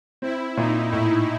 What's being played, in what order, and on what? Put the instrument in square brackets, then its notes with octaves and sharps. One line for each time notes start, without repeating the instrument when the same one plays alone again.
[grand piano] C4 [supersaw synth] E4
[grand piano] A#2 [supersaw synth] D#4
[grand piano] A2 [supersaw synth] E4